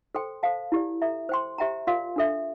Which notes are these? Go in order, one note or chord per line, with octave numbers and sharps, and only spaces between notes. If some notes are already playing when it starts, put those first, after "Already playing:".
A4 C5 G5 C6
A4 C5 F5 A5
E4 G4 D5
A4 E5 A#5
C5 G5 C6
G4 C5 E5 G5 A#5
F4 A#4 D5 F5 C6
D4 A4 E5